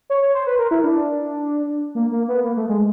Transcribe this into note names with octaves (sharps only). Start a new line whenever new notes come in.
C#5
C#5
C5
B4
A#4
E4
D4
A#3
A#3
B3
A#3
A3
G#3